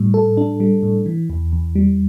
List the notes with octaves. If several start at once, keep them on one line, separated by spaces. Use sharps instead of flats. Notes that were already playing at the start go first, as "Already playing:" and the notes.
Already playing: A2 G3
A4
D4
G3
A2
E3
E2
E2
G3